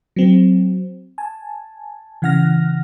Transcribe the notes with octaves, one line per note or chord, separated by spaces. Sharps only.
F#3 C4
G#5 A5
C#3 E3 F#5 F6 A#6